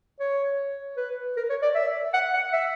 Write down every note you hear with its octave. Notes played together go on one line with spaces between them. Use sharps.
C#5
B4
A#4
C#5
D5
E5
F#5
F#5
E5